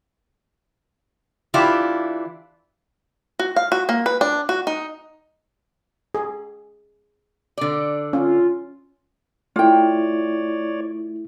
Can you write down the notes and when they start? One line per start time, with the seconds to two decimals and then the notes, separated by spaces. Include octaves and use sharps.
1.54 E3 D4 E4 F4 G4
3.39 F#4
3.56 F5
3.72 F#4
3.89 A#3
4.06 B4
4.21 D4
4.49 F#4
4.67 D#4
6.15 G#4
7.58 D3 D5
8.13 C#4 F4
9.56 A3 E4 F4 C#5 D5 G5